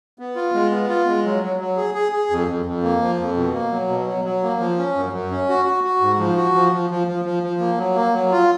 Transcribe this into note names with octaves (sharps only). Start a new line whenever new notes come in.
B3
F4
G#3
B3
F4
G#3
F#3
F#3
F#3
G#4
G#4
G#4
F2
F2
F2
A#3
F3
F2
B2
A#3
F#3
B2
F#3
F#3
A#3
F3
C#4
F#2
F#2
C#4
F#4
F#4
F#4
G#2
F3
F#4
F3
F3
F3
F3
F3
F3
A#3
F#3
A#3
F#3
F4